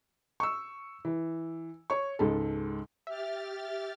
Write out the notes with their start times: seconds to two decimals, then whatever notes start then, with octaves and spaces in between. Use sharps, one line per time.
0.40 C#6 E6
1.05 E3
1.90 C#5 C#6
2.19 C#2 G#2 A4
3.07 G4 E5 F6 A6